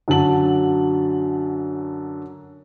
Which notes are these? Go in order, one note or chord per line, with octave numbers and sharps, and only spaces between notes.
F#2 D3 F#3 A5 F#7